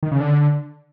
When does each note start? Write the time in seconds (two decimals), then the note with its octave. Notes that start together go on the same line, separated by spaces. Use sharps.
0.03 D#3
0.11 C#3
0.20 D3